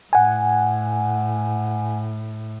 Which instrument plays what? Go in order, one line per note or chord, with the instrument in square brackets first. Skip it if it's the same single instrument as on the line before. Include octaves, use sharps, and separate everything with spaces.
[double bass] A2 [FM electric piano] F#5 G#5